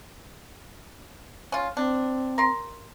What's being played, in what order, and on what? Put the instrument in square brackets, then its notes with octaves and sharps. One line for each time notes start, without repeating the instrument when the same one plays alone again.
[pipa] C#4 F4
[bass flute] C4 [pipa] D4
[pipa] A#4 C6